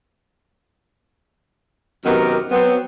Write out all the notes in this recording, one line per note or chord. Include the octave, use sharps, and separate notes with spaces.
F#2 C3 D#3 B3 G4 A#4
F#3 B3 C4